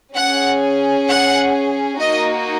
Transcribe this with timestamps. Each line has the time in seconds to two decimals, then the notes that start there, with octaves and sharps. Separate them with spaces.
0.15 C#4 G#4 F#5
1.08 F#5
2.00 A#3 D#4 F#4 D#5